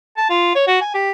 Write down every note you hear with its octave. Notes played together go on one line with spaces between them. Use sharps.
A5
F4
C#5
F#4
G#5
G4